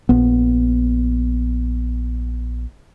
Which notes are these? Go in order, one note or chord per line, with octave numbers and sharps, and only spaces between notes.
A#1 B3